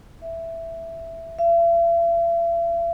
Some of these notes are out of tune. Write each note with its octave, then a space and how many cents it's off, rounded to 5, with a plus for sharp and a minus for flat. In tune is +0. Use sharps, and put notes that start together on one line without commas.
E5 +5
E5 +45